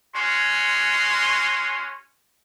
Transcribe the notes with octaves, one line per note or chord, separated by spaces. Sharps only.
G#3 C#4 F#4 C6